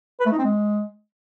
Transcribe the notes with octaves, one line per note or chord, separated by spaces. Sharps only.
B4
A3
D#4
C4
G#3